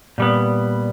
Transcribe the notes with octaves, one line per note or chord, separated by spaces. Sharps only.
A#2 G3 B3